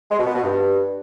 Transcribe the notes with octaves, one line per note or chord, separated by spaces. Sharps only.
G#3
B2
B3
B2
G2